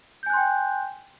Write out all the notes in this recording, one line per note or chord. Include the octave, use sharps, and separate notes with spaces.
G5 G#5 C6 F#6 G6